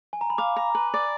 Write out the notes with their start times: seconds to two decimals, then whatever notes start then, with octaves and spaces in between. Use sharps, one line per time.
0.13 G#5
0.21 A#5
0.30 B5
0.38 F5 D6
0.56 A#5
0.75 B4
0.94 D5